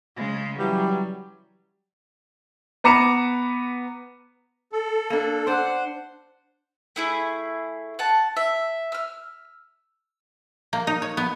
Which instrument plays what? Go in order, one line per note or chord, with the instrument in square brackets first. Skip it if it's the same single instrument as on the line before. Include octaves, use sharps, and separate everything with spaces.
[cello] C#3 G#3
[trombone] E3 [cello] F#3 [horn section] G3
[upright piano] B3 B4 A#5 D6 C#7 E7
[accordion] A4
[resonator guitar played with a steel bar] A#3 D4
[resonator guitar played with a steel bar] D4 [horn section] C5 F#5
[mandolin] A3 E4 G#4
F#5 A5
E5
E6 F6
[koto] A#3
D#4
C#5
B3